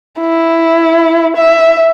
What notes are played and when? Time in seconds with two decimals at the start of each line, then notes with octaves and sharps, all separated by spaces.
0.20 E4
1.37 E5